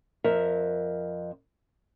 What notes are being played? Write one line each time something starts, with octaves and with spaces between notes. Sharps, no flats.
F2 A#4 E5